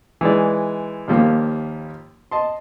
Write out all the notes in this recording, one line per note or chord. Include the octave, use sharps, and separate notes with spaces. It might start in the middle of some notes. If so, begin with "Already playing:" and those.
E3 G#3 D#4 D5
D#2 F3 G3 A#3
D#5 A5 C6